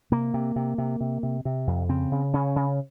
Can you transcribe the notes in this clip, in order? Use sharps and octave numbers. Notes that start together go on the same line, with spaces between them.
C3 A#3
C3
C3
C3
C3
C3
C3
F2
C#3 C4
C#3
C#3 C#4
C#3